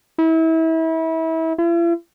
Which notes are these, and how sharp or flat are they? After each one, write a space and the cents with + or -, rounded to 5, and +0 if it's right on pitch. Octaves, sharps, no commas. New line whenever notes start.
E4 -30
E4 +45